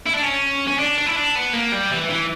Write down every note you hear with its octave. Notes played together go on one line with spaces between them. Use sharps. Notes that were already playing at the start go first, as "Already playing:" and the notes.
E4
D4
C#4
C#4
D4
D4
E4
D4
B3
A#3
G3
E3
E3